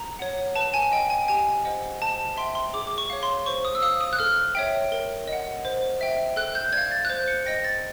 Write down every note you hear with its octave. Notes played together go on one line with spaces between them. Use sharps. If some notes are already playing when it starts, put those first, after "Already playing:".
Already playing: A#5
C#5 F#5
B4 A5
G#5
D#5 G5
G#5
G4 G#5
C5 D#5 F#5
C5 A5
E5 G5 C6
C6
G#4 D6
D6
C#6
C#5 F5
C6
C5 C#6
D#6
E6
F5 D#6
D#6
F#6
A4 F6
C#5 E5 G5
A#4
D#5
F#5
C5
E5 G5
A4 F#6
G6
D5 F5 G#6
A6
F#6
C5 G6
C#7
D#5 G5 A#6
A6